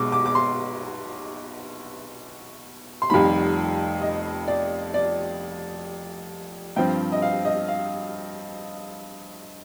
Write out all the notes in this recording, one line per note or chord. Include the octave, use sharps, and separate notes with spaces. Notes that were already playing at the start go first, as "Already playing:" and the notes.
Already playing: B1 B2 G#3 D6
D6
D6
C6
C6
F1 F2 D#3 G3 B5
D#5
D5
D5
G2 F3 C4 G5
D#5
F5
D#5
F5